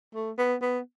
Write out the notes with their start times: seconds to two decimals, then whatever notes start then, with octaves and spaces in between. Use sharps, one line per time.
0.15 A3
0.38 B3
0.62 B3